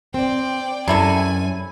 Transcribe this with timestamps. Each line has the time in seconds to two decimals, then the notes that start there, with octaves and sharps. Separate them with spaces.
0.14 C4 D5 G5
0.88 F#2 C3 E4 A4 G#5